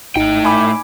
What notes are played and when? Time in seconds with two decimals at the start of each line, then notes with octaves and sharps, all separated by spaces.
0.16 G#1 A2 D#4 G5
0.44 G#5 B5 D6